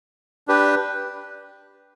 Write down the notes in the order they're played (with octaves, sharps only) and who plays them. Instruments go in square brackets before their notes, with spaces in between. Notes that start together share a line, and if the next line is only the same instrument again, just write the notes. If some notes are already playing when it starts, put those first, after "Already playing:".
[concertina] D4 G4 B4